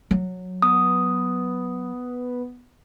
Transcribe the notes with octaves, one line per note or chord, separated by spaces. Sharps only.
F#3
B3 D#6